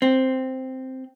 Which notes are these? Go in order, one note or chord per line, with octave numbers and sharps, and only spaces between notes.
C4